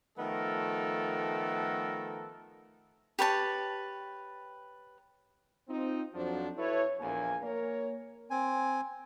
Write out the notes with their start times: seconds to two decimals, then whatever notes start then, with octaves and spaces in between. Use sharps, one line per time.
0.18 D#3 F3 A3 B3 A4 A#4
3.19 G4 B4 C#5 A5
5.68 C4 D#4 F4
6.14 F2 F3 F#3 D4 F#4 C5
6.57 E4 A4 B4 C#5
7.00 A#1 E2 A#3 G#5
7.41 A#3 A#4 C#5
8.30 C4 G#5